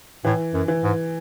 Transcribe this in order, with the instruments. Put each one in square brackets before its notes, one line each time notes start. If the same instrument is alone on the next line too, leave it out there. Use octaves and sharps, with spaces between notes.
[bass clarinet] A2 [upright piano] E3
[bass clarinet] F#2
[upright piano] E3
[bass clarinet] G#2